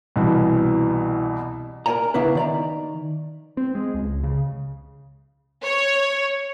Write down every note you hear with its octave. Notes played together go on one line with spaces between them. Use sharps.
C2 B2 E3
A#4 C5 D5 G#5 A#5
C#3 B3 D4 E4 B4
D#3 D5 A#5
C4
G#3
C#2
C#3
C#5